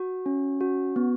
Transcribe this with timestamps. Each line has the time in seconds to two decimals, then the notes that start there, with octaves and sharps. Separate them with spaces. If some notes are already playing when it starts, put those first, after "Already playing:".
Already playing: F#4
0.26 C#4
0.61 F#4
0.96 B3